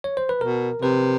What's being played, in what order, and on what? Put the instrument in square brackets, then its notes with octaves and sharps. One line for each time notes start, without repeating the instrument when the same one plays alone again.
[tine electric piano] C#5
C5
B4
[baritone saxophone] B2 [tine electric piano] A#4
[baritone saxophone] C3 [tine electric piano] B4